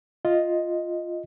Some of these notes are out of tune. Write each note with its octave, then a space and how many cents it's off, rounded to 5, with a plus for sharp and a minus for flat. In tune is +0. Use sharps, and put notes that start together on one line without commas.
F4 +0 D#5 +0